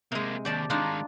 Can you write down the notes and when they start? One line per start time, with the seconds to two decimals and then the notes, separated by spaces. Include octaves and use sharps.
0.12 C3 G#3 A#3 G#4
0.45 D#2 G4 D5 A5
0.70 D#3 G#3 D4 D#4 F4